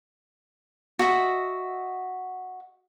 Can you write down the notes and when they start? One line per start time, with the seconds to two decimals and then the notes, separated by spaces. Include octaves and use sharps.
0.99 F#4 D#5 E5